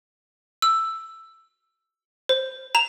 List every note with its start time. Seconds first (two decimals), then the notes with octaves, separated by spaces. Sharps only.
0.62 E6
2.29 C5
2.75 A#5 E7 F7